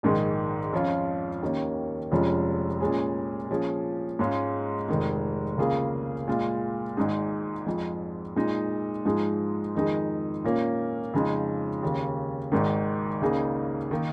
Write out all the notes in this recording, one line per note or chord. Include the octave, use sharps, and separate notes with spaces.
A#1 G#2 D#3 G#3
F2 F3 C#4 F4
D#2 D#3 A#3 C#4
F1 F2 F3 G#3 C#4
A#2 G#3 C#4 G#4
A#2 F3 C#4 G#4
G#2 G#3 C#4 F4
F1 F2 D#3 G#3
C#2 C#3 A#3 F4 G#4
A#2 G#3 F4
G#1 G#2 G#3 D#4 G#4
F2 F3 G#3
A#2 G#3 D#4
G#2 F3 G#3 D#4 G#4
F2 D#3 G#3 D#4 G#4
A#2 A#3 C#4
F2 C#3 F3 G#3 D#4
D#2 C#3 A#3
G#1 G#2 D#3
C#2 C#3 A#3 D#4 G#4
D#3 A#3 D#4